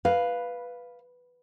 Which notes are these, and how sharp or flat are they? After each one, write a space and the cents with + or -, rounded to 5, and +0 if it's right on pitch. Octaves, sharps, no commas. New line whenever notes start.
B4 +0 F5 +0